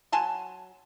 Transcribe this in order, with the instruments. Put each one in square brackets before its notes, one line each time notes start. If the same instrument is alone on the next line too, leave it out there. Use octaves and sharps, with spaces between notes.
[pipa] F#3 G#5 A5 C6